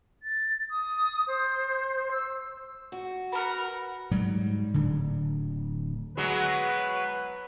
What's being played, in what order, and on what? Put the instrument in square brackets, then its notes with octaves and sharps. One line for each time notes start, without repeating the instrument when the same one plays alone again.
[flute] A6
D#6
C5
E6
[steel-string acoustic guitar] F#4
[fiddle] A#4 F#5 [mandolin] B4 F6 [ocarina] B5
[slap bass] G#2 F#3 G3
D1 D3
[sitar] F#3 G#3 B3 [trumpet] B4